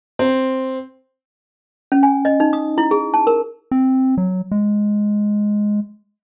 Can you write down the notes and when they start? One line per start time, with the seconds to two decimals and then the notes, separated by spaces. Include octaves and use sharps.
0.19 C4
1.92 C#4
2.03 G#5
2.25 D#5
2.40 D#4
2.53 D#6
2.78 E4
2.91 G#4
3.14 A5
3.27 A#4
3.71 C4
4.18 F#3
4.51 G#3